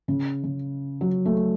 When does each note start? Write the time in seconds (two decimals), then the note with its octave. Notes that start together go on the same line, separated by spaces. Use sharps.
0.08 C#3
0.44 C#3
1.01 F#3
1.25 A3